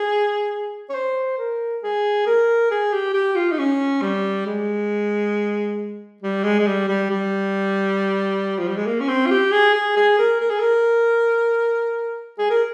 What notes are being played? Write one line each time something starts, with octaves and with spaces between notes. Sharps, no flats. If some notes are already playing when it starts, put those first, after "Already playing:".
Already playing: G#4
C#5
C5
A#4
G#4
A#4
G#4
G4
G4
F4
D#4
C#4
G3
G#3
G3
G#3
G#3
G3
G3
G3
F3
G3
G#3
A#3
C#4
C4
F4
G4
G#4
G#4
G#4
A#4
A#4
G#4
A#4
G#4
A#4